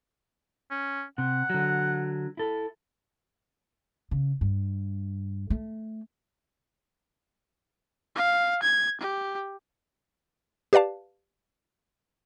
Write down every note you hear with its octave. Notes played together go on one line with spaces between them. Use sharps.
C#4
C3 F#5
D3 F#3
E4 A4
C#3
G2
A3
F5
G#6
G4
G4 B4 D5 F5 A5